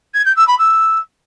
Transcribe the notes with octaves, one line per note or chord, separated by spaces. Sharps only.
G#6
G6
E6
B5
E6